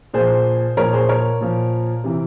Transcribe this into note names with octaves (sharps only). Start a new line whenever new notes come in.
A#2 F3 G#4 C5
A#2 F3 A#4 C#5
G#4 C5
A#4 C#5
A#2 F3
C3 E3